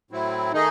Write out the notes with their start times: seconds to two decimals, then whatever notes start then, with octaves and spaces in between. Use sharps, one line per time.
0.11 A2 F#3 C4 E4
0.53 D#3 A3 D#4 G#4 D#5